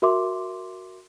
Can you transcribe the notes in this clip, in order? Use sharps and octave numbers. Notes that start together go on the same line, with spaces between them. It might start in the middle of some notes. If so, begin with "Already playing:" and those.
F#4 A#4 E5 C6 D6